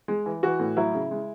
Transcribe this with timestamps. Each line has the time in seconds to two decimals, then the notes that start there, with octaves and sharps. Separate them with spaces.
0.08 G#3
0.26 E3
0.43 E3 F#4
0.60 A2
0.77 F#3 E4
0.94 C#3
1.11 G#3